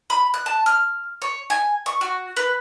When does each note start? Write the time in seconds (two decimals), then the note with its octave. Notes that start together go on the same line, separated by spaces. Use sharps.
0.10 B5
0.34 F#6
0.46 A5
0.66 F6
1.22 C#5
1.50 G#5
1.86 C#6
2.01 F#4
2.37 B4